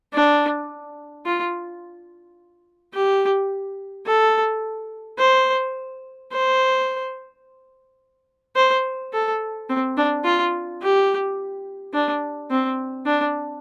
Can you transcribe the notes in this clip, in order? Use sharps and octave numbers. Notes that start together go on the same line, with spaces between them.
D4
F4
G4
A4
C5
C5
C5
A4
C4
D4
F4
G4
D4
C4
D4